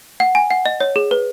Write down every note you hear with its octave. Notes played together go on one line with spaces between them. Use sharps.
F#5
G#5
F#5
D#5
C#5
G#4
B4